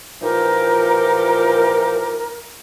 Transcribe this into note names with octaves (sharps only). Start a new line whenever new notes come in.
A#2 E3 F3 D#4 G4 A#4